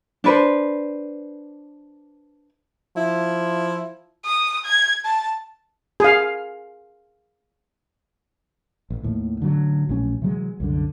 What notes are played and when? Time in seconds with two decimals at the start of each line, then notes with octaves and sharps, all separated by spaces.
0.24 D4 B4 C5
2.97 F3 E4
4.25 D#6
4.65 G#6
5.05 A5
6.00 G#4 F5
8.90 A1
9.03 D#2 A2
9.41 A1 D3 D#3 F#3
9.89 A#1 A2 F#3 C#4
10.22 C3 E3 F#3 G#3
10.60 C2 F#2 D3